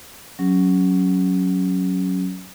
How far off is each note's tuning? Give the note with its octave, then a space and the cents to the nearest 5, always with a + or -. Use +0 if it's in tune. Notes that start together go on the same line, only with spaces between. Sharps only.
F#3 +0 C#4 +0 G4 +35